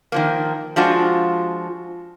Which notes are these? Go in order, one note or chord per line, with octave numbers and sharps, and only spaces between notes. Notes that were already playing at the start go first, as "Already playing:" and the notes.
D#3 F3 A#3
F3 G#3 D4 F4 F#4